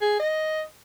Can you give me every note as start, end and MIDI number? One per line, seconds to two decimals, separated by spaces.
0.01 0.19 68
0.20 0.61 75